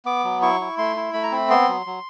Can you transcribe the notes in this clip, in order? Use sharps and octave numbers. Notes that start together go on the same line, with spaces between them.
B3 D6
F#3
E4 C#6
E4
A3 C6
E4
A3 B5
A#5
C4 B5
B3 C6
F#3
F#3